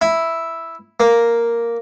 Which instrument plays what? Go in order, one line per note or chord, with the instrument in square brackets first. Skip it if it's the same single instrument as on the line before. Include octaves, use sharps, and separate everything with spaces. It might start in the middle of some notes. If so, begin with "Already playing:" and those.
[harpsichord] E4
A#3